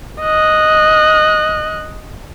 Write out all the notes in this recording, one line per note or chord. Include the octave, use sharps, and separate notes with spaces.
D#5 F#6